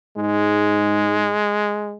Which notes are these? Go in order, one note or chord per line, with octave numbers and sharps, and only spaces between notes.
G#2 G#3